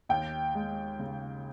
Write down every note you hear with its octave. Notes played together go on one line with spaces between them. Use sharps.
D#2 G5
G#3
C#3